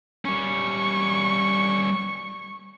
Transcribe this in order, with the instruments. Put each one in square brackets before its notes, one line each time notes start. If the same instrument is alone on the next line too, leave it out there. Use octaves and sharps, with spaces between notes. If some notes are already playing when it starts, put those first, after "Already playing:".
[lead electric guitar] G3 C#4 [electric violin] C#6